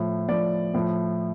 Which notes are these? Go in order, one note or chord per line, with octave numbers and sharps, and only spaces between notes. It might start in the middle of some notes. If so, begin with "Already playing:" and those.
Already playing: A2 F3
A2 F3 D5
A2 F3